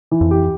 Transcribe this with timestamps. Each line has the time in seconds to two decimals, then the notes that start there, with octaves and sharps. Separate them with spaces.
0.11 E3
0.21 F2
0.31 G4